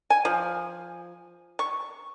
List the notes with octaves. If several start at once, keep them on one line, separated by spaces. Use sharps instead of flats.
G#5
F3
C#6